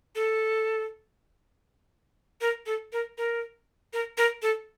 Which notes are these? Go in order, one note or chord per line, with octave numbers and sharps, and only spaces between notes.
A4
A#4
A4
A#4
A#4
A#4
A#4
A4